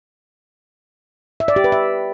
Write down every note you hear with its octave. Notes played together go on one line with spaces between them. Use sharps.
E5
D5
G4
B4
E5